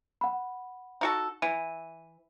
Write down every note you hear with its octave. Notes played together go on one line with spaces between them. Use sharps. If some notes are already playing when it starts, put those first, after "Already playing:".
F#5 B5
D#4 F#4 A4
E3 D#7